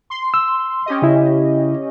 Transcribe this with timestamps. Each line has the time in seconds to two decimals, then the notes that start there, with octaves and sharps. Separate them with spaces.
0.10 C6
0.34 E6
0.86 C#4 G4 D#5
1.02 C#3 E4